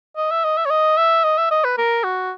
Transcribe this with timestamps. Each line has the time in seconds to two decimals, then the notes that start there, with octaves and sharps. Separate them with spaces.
0.17 D#5
0.31 E5
0.44 D#5
0.57 E5
0.65 C#5
0.70 D#5
0.98 E5
1.24 D#5
1.38 E5
1.51 D#5
1.64 B4
1.78 A#4
2.04 F#4